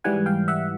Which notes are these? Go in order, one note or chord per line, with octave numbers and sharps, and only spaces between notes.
G#2 E3 G3 F#5 G#5
F5 G5
E5 F#5